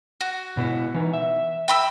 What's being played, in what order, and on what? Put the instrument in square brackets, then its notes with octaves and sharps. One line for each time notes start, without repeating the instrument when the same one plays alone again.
[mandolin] F#4
[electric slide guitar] B2 B3 E4
E3 D#4
E5
[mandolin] G5 B5 E6